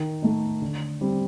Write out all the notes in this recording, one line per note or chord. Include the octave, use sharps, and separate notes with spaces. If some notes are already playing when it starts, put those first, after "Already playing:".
Already playing: D#3
A3 D#4
D3
G3 C4